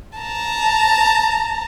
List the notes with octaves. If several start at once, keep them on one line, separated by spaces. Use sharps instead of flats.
A5 A#5